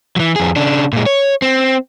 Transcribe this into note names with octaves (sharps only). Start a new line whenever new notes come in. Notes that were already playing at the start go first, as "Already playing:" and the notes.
E3 F#3
F2 G#4
C#3 D4
A#2 G#3
C#5
C4